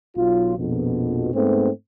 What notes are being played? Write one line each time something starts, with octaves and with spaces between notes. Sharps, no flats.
B1 F#3 F4
A#1 F2 B2
G#2 A3 B3 C4